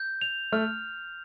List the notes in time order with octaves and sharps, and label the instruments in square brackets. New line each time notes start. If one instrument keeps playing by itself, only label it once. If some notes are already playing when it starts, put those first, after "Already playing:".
Already playing: [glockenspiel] G6
F7
[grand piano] A3 [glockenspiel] F6